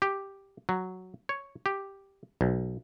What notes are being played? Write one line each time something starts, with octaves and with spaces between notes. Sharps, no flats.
G4
F#3
C#5
G4
B1